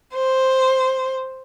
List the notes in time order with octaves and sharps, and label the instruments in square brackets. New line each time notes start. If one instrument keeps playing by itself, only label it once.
[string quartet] C5